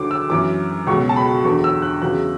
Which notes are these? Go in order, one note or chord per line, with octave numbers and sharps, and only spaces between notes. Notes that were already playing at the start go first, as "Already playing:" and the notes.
Already playing: D2 D3 F#3 D6
E6
F#2 E3 D6
C#2 B2 F#3 C#6
A5
B5
E2 D3 F#3 C#6
E6
F#6
E2 C#3 F#3 F#6